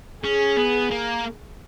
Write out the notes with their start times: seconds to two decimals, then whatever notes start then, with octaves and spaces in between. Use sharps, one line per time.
0.24 C#4 G#4
0.57 B3
0.91 A#3